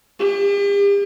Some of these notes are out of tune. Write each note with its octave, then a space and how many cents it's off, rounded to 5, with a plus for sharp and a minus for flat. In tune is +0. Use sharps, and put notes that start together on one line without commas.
G4 +40